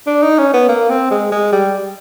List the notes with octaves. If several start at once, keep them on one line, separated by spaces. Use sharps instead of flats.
D4
D#4
C#4
B3
A#3
C4
G#3
G#3
G3